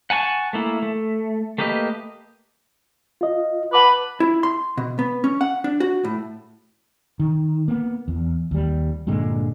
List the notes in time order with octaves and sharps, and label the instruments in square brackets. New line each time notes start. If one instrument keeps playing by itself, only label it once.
[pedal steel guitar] F#5 G#5 A5 C#6
A3 A#3 E4
A3
A3 A#3 G4 B4 D#5
[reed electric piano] F4 D#5
[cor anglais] B4 [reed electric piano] F#5 A5 D6
[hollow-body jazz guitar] E4
C6
B2
B3
C#4
F#5
D4
F#4
A2
[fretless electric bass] D#3
A#3 B3
E2
D#2 G3
G2 A#2 D3 G#3